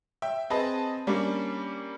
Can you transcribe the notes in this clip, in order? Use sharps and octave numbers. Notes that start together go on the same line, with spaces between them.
E5 G5
C4 G#4 B4 D#5 A5
G3 A#3 C#4 D4